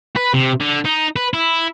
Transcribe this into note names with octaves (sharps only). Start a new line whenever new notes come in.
B4
C3
D3
D#4
B4
E4